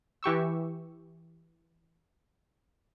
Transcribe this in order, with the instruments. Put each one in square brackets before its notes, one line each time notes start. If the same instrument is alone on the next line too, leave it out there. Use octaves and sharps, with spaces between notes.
[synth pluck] E3 G4 C#6 E6